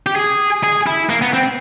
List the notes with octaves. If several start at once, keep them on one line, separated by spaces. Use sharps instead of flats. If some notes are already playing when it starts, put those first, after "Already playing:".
G4
G#4
G#4
E4
A#3
B3
C4